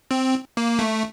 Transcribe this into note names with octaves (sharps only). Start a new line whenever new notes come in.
C4
A#3
A3